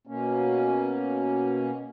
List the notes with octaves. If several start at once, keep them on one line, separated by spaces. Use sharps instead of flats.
B2 A#3 C#4